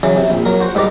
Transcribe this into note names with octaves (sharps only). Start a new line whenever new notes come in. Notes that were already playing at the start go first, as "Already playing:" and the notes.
C#3 E3 F#3
C3
A#1
F#3 A#4
F#4 C5 F#5
G#2 G3 B4 D5 A#5